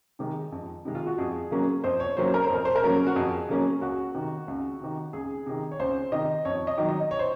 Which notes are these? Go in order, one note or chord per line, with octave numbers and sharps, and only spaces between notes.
C3 D#3 G#3
F2
C3 D#3 G#3
F4
F#4
F2 G#4
C#3 F#3 A#3 C#4
F2 C5
C#5
C#3 F#3 A#3 C#4 C5
A#4
C5
F2 A#4
C5
A#4
C#3 F#3 A#3 C#4
F#4
F2 G#4
C#3 F#3 A#3 C#4
C#2 F#4
C3 D#3
C#2
C3 D#3
C#2 G#4
C3 D#3
C#5
C#2 C5
C3 D#3 D#5
F2 C#5
D#5
D#3 F#3
D#5
C#5
C5